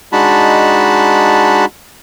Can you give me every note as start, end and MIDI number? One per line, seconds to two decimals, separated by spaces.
0.13 1.65 56
0.13 1.65 62
0.13 1.65 63
0.13 1.65 66
0.13 1.65 81
0.13 1.65 83